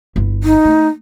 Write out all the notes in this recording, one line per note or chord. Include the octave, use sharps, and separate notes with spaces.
G1 E4
D#4
A3